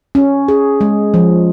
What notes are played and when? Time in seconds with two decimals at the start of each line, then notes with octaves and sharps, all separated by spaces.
0.15 C#4
0.48 G#4
0.81 G#3
1.14 F3